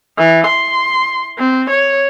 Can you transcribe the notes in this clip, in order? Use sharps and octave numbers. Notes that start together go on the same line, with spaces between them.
E3
C6
C4
C#5